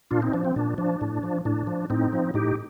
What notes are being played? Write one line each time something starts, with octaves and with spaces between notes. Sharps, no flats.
A#2 D4 F4
C4 D#4
F3 D4
C4
A#2 D4
F3 D4
A2
F3
A2 D4
F3
A2 C4 D#4
F3
A2 D#4 G4